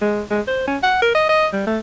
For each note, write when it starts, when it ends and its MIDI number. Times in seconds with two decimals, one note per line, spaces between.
0.01 0.22 56
0.30 0.41 56
0.47 0.65 72
0.67 0.77 61
0.83 1.00 78
1.02 1.11 70
1.15 1.25 75
1.29 1.46 75
1.53 1.63 55
1.67 1.79 57